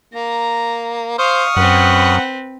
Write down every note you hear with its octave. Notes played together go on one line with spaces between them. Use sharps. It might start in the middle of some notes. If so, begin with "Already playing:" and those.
A#3 A#5
C5 F5 C#6 D#6 F6
F#2 C4 B4 F#5